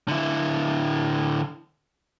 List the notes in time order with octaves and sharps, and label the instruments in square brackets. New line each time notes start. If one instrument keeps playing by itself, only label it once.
[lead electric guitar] D3 E4